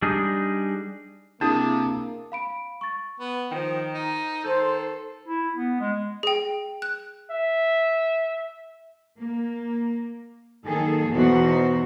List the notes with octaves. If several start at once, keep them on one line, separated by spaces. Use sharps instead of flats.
G3 D4 D#4 G#4
C3 A#3 D4 E4 G#4 A5 D#6
F5 B5 D7
C#6 A6
B3
D#3 F3 C5 G5
D#4
D#3 A4 C5 G6
E4
B3
G#3
G#4 G5
F#6
E5
A#3
D#3 F#3 A#3 G#4 A4
E2 B2 E3 D#4 F#4 C5